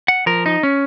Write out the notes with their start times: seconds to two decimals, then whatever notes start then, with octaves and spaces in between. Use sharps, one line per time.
0.08 F#5
0.26 F3 A#4
0.46 D#4
0.63 C#4